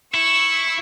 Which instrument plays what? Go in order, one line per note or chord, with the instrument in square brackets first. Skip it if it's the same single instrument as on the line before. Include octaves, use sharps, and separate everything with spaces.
[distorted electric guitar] E4 [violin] C#6 E6